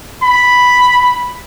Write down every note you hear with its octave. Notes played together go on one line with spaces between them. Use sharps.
B5